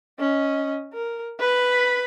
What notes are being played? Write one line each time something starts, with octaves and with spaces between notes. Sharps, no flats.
C#4 D#5
A#4
B4 B5